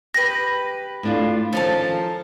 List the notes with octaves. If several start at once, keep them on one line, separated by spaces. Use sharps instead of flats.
G4 B4 A#6
A2 D4 F4
D#3 F3 C#4 A4 F5 A5